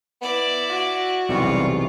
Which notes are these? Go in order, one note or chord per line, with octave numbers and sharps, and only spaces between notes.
B3 E4 D5
F#4
B1 E2 C3 G3 F4 C#6